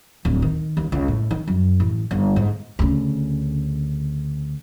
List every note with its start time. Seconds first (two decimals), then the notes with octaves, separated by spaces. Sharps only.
0.25 D1
0.42 D#3
0.77 D#2
0.92 C#2
1.08 A2
1.31 D#3
1.48 F#2
1.80 A1
2.11 G1
2.36 G#2
2.79 D2 C#3